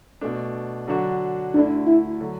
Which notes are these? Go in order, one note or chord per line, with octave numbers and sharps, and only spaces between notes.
B2 A3 D4
D3 F#3 D4 F#4
D2 D3 A3 D4 E4
E4
D3 F#3